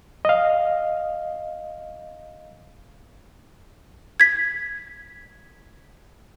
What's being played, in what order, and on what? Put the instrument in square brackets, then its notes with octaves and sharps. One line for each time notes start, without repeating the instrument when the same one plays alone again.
[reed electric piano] D#5 F5
[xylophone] G#6 B6